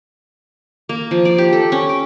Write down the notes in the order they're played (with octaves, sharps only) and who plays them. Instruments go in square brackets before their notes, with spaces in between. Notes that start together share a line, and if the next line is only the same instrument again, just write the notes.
[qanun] A#3
F3
D5
G4
A4
C#4
D6